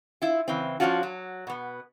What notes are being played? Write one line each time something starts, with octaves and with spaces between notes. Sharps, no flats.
E4 F4
C#3 E3 C4
F3 G#3 C#4 D4 F4 F#4
F#3
B2 B3